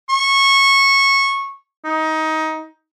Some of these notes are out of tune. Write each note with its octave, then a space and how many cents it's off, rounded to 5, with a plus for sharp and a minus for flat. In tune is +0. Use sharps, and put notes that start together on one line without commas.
C#6 -15
D#4 +20